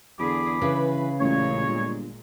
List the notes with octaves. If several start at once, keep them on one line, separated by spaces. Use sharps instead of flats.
E2 D3 G#4 B5 D6
C#3 E3 B4
A1 A#2 G#3 C#5
G1